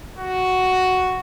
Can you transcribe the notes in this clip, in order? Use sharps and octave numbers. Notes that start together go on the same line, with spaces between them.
F#4